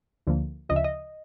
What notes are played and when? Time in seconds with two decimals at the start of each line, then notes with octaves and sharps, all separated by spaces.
0.27 D2 D3 F3 A#3
0.69 D2 C#3 F3 D#5
0.76 E5
0.84 D#5